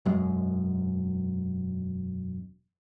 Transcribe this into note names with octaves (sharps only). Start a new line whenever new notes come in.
E1 F#2 G#3